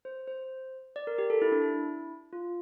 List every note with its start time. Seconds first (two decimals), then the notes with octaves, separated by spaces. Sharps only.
0.05 C5
0.28 C5
0.96 D5
1.07 A#4
1.18 G4
1.30 A4
1.42 E4
1.52 D4
1.62 E4
2.33 F4